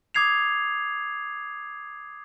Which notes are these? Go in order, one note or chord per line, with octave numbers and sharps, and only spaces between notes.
D6 D#6 G#6 C7 F7